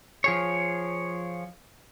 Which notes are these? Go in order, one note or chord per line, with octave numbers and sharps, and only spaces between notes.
F3 G#4 C#5